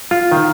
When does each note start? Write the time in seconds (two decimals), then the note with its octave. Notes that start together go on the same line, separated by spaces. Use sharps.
0.11 F4
0.32 D#3